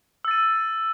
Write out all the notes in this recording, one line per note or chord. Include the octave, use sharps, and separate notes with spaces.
E6 A6 D#7